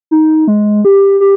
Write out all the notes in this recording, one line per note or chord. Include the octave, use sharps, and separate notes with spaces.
D#4
G#3
G4
G4